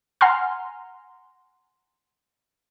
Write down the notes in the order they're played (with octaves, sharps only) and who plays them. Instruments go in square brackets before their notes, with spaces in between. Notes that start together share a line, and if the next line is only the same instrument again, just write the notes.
[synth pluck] F#5 G#5 A#5 C6 F6